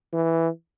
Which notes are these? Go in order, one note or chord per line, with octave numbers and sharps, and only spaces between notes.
E3